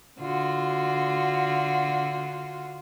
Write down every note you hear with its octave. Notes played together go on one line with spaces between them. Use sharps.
D3 F4 F#4